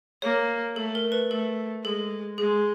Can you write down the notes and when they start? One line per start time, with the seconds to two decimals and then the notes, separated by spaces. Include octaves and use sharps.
0.22 A#3 C#5
0.76 A3 A4
0.95 A#4
1.12 B4
1.30 A3 A4
1.84 G#3 A4
2.38 G#3 G#4